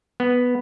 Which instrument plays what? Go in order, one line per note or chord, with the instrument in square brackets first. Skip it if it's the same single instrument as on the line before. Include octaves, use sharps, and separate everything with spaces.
[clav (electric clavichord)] B3